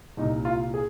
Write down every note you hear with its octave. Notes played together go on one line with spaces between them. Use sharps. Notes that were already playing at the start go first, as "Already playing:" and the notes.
C2 A#2 D#4
F4
G#4